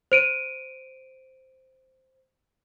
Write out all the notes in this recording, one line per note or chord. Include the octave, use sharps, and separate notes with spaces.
C5 D7 D#7